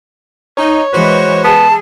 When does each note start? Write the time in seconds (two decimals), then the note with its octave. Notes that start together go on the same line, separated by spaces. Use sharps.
0.57 D#4 C#5
0.93 E3 G#3 F#4 B4 C5
1.44 B3 G#4 A5